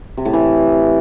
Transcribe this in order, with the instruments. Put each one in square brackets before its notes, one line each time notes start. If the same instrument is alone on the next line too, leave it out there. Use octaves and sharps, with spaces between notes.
[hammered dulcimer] C3
A2
E3